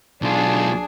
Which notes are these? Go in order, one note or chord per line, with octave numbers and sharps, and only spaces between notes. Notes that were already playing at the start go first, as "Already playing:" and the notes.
B1 D4 F4 G#4